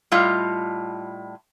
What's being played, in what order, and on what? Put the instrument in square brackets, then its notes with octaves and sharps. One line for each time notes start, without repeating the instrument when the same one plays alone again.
[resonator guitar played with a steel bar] A2 G3 F4 D#5